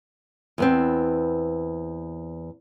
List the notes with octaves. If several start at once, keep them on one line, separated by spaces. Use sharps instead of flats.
E2 B3 C4